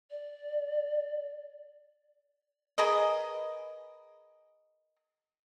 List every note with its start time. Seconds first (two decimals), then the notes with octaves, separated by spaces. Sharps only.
0.11 D5
2.78 G#4 A#4 B4 D#5